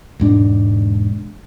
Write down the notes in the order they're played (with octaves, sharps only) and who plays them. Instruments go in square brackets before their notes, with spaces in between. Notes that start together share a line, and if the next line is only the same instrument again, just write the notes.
[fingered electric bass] E1 G#2 D4